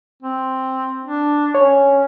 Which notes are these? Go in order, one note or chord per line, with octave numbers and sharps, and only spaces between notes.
C4
D4
C#4 C#5